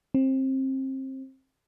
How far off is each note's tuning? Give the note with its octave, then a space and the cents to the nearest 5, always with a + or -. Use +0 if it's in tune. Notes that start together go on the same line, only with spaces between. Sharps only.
C4 +25